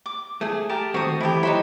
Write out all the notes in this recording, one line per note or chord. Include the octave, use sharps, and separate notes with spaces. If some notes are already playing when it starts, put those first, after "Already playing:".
D6
A3 G#4
G4 A#4 A5
D#3 A3 C4 F#4 D#6
E3 A3 E4 G4
F#3 D#4 E4 C5 C#5 B5